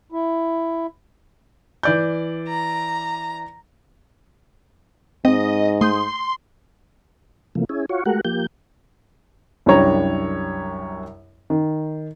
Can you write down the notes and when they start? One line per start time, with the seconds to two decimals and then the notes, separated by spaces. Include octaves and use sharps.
0.12 E4
1.83 E3 D5 G6
2.48 A#5
5.25 G#2 C4 D#5
5.81 A3 C6 D#6 G6
7.55 C3 E3 F3 A3 A#3
7.69 C#4 E4 G#4
7.89 F4 F#4 C#5
8.06 G#3 A3 F#4 G4 A#4 F#5
8.25 F3 A#3 G4 G6
9.66 C2 F#2 G3 D4 C#5 A#5
11.50 D#3